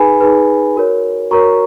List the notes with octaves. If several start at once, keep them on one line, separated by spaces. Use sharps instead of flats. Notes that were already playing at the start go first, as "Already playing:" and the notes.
Already playing: D#4 G#4 B4 G#5 B5
D#4 G#4 B4
F#4 A#4 C#5
F#4 A#4 C#5 A#5 C#6